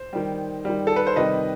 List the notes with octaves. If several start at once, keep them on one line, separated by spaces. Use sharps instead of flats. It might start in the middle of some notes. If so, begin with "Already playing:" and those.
Already playing: C5
D#3 G3
D#3 G3
A4
B4
C5
C3 D#3 G3 B4 D#5